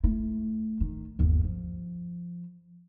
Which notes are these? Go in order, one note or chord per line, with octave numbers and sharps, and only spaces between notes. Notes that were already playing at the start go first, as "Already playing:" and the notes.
A3 E4
D#3
G1 D#2
F3